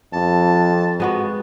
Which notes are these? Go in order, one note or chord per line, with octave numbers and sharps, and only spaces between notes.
F2 A5
G#3 B3 F#4